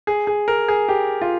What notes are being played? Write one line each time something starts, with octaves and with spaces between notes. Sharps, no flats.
G#4
G#4
A#4
G#4
G4
F4